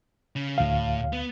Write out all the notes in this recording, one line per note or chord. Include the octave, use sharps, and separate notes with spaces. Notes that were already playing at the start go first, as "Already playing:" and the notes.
C#3
D2 A2 F5
B3